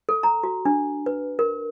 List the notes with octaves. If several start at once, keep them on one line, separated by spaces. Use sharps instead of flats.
A4
A#5
F#4
D4
B4
A#4